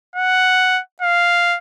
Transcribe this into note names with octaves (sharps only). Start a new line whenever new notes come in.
F#5
F5